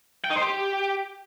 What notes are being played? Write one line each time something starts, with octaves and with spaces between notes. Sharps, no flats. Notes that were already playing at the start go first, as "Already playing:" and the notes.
G5
D#4
C5
G4